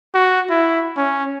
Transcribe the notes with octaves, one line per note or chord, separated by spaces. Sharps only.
F#4
E4
C#4